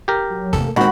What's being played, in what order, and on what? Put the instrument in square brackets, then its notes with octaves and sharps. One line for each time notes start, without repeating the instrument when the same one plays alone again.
[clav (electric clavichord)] G4 A#4
[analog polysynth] F#3
[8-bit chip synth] G1 E2 A4 [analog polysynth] C3 A3 A#3
[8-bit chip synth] A#2 C4 [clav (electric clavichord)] D#3 [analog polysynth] G#3 G#4 [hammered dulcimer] F#4 B5